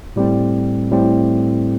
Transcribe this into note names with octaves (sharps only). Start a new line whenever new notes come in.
A2 G3 C4
A2 G3 C4